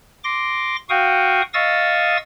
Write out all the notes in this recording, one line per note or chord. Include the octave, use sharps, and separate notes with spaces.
C6 D6 A#6
F#4 F5 G5 C#6 D#6
D#5 F5 C#6 D#6 E6 A6